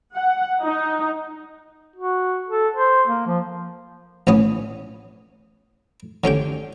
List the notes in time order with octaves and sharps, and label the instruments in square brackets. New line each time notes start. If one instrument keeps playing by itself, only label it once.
[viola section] F#5
D#4
[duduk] F#4
A4
C5
A#3
F3
[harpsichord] A1 B3 C#4 D#6
D3 C#4 G4 G5